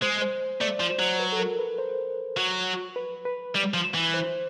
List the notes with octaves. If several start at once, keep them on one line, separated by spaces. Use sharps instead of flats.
G#3 C5
C5
A3 D5
F3
C5
F#3
B4
A4
A#4
B4
C5
F#3
B4
B4
G3
F3
E3
C5